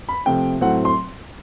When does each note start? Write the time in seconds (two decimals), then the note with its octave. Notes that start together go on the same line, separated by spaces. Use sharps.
0.09 B5
0.26 C3 F3 A3 G5
0.61 A2 F#3 A3 C4 F#5
0.85 C6